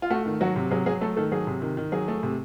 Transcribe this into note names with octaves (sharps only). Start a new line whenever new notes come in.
F4
A3 F#4
D#3
F#3 F#4
C3
F#3 G#4
F#3 G#4
A3 A4
D#3 A4
F#3 G#4
C3
D#3
D#3
F#3 G#4
A3
C3